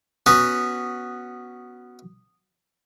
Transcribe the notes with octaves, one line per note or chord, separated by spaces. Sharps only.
B3 C#4 F#4 D#6